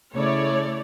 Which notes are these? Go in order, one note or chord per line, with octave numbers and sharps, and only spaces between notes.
C#3 A3 E4 C#5 D5